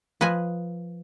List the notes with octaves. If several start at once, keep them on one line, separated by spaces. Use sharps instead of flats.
F3 B4 D#5 G#5